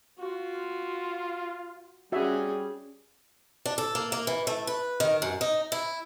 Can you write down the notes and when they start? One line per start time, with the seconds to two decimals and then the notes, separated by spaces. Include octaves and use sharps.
0.19 F4 F#4
2.12 G3 C#4 F#4 G#4 E5
3.66 D4
3.78 A4
3.95 A#3
4.12 A#3
4.27 E3
4.47 A3
4.67 B4
5.00 D#3
5.22 F#2
5.41 D#4
5.72 E4